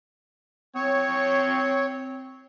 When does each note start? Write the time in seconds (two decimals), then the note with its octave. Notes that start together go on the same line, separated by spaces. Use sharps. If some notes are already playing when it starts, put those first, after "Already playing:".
0.75 C4 C#5